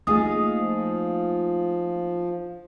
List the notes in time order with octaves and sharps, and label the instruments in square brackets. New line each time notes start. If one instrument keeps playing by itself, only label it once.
[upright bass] A3 A#3 [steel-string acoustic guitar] D#4 F4 G#4 [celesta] D#6
[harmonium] F3